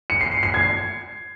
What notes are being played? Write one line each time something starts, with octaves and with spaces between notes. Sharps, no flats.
C#7
C7
C7
C7
G#6